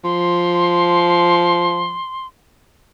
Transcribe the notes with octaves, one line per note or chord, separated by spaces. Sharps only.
F3 C6